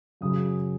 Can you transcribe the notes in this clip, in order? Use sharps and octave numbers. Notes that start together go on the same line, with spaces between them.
F#2 C#3 F#3 D#6